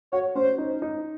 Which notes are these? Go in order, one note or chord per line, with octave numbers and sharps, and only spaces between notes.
F#4 C#5
C#4 C5
D#4
D#4